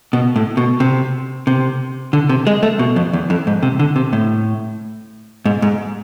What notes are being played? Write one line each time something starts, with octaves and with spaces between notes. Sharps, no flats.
B2
A2
B2
C3
C3
D3
C3
G#3
A3
B2
F2
E2
F2
G#2
C3
D3
C3
A2
G#2
G#2